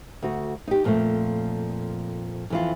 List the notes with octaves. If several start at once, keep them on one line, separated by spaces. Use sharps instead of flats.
D2 F#4
D#4 G4
F2 A#2 F3 G3 A3
F2 E3 F4